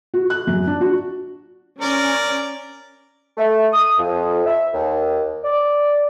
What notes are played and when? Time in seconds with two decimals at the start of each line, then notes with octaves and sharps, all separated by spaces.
0.14 F#4
0.30 F#6
0.47 F#2
0.67 D4
0.81 F#4
1.81 C#4 A#4 D5
3.37 A3
3.72 D#6
3.98 F2
4.46 E5
4.73 D#2
5.44 D5